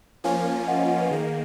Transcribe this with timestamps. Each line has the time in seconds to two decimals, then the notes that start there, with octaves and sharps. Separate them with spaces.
0.24 F3 A#3 C#4 F4 F5 G#5
0.67 D#5 F#5
0.78 D#5 F#5
0.89 D#5 F#5
1.01 B4
1.11 D#3 A#3 G#4